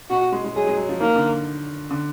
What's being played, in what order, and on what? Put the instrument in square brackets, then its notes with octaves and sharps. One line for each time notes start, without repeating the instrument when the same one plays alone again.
[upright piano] B2 [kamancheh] F#4
[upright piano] G#3
G#3
[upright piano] F#3 [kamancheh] G#4
[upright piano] G#3
F#3
F3
[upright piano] D#3 [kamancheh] A#3
[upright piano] D3
D3